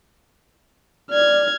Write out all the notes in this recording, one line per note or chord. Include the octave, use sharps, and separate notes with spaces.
D5 F6 G#6